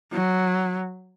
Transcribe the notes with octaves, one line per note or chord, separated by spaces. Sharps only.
F#3